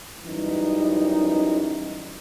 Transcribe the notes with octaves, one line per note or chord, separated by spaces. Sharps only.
F#2 E3 G3 D#4